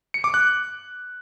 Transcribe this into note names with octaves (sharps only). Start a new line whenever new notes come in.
C#7
D6
F#6